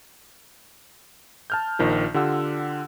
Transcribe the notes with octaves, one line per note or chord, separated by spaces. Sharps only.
A5 F6 G6
A#1 D#3 F3
D3 F4 G4 F#5 E6